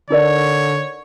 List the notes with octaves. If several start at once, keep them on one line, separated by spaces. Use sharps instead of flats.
D3 D#4 A#4 C#5 D5